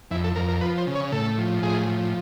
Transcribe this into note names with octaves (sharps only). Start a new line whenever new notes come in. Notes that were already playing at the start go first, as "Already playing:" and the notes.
F2 E4
A4
F2 A#4
A#4
F3 B4
C5
C#3
C#5
A2 A4
F3
A2 G#4
F3